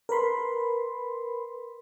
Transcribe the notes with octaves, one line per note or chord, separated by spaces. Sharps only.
A#4 B4 B5 C6